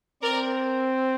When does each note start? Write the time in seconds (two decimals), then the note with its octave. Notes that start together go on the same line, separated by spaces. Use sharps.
0.22 C4 A#4 D5